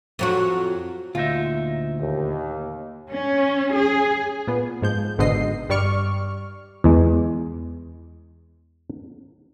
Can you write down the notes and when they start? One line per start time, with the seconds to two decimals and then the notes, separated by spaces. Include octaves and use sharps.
0.19 F2 F#3 F#4
1.15 D2 A#2 D#4 F4 E5
1.99 D#2
3.11 C#4
3.74 G#4
4.47 A#2 B3
4.82 G#2 F3 G6
5.18 G#1 G#2 B2 D3 D#5 C7
5.69 G2 G3 D5 C#6 F6
6.84 E2 G#3